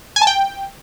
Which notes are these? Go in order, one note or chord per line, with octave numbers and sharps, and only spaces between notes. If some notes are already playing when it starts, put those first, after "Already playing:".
G#5
A5
G5